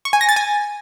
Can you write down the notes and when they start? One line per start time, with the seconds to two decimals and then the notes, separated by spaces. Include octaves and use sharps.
0.05 C#6
0.13 G#5
0.21 A#6
0.29 A6
0.36 G#5